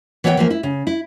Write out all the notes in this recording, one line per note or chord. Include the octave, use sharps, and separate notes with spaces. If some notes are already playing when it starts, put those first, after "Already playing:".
E3 B3 C#5 E5 G5
E3 F3 A#3
E4
C#3
E4